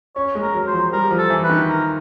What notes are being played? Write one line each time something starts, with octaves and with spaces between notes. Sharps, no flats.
C#4 C#5
G#3
A#4
F#3
C5
F3
G3 A#4
F3
A4
E3
B4
D#3
A#4